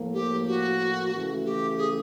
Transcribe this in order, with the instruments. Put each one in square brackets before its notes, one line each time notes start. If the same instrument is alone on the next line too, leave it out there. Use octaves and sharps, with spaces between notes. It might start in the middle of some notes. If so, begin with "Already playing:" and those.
Already playing: [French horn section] A2 F3 A#3
[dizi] G4
F#4
[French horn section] C#3 E3 A3
[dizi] G4
G#4